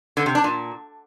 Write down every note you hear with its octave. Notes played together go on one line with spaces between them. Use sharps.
D3
C3
D4
A#2